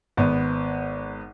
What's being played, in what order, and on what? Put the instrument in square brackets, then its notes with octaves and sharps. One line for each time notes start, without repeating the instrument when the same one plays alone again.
[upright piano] G#1 B3